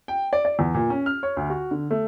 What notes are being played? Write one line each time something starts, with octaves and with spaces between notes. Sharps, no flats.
G5
D5
D5
E2
A#2
C#4
F6
C#5
D2
F#4
D3
A3